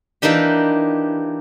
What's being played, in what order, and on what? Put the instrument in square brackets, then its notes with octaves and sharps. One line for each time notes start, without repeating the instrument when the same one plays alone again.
[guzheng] E3 A#3 D4 D#4 G4